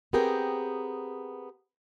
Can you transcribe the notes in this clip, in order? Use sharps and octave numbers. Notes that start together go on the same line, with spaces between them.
B3 C4 G4 G#4 A#4 G5